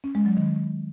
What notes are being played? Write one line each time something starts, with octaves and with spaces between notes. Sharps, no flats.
C#4
G#3
F#3
D#3